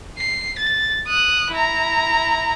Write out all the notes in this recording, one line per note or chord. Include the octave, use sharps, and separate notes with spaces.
C7
A6
D#6 F#6
E4 A#5